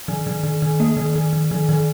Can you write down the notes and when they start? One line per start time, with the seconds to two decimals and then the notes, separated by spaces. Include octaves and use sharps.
0.08 D#3
0.27 D#3
0.43 D#3
0.62 D#3
0.80 A#3
0.97 D#3
1.15 D#3
1.33 D#3
1.51 D#3
1.69 D#3